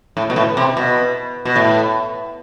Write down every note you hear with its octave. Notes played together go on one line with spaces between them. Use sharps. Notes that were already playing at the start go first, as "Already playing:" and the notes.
A2
B2
A2
C3
B2
B2
A2